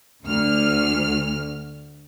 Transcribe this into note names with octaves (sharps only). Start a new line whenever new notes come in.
D2 F6